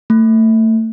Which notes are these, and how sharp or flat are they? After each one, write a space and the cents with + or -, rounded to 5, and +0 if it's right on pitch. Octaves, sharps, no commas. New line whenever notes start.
A3 +25